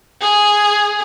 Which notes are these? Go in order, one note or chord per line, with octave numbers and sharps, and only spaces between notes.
G#4